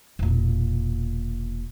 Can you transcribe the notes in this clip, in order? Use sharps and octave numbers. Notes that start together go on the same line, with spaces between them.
E1 A#2